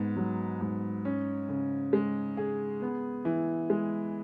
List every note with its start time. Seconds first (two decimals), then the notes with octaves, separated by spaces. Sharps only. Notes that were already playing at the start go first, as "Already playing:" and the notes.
Already playing: G#2 B3
0.17 F#3
0.61 G#2
1.05 C#4
1.49 C#3
1.93 G#3
2.37 G#4
2.82 B3
3.25 E3
3.70 G#3